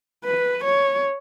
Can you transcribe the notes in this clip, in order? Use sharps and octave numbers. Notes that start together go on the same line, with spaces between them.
B4
C#5